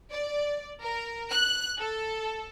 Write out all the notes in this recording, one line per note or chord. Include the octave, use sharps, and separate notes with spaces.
D5
A#4
F#6
A4